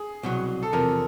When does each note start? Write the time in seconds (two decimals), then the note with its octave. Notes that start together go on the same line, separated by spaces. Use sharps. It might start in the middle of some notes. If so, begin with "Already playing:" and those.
Already playing: G#4
0.23 C2 B2 F#3
0.63 A4
0.72 E2 C3 F3 A#4